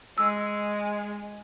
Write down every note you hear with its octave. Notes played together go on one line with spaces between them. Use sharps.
G#3 E6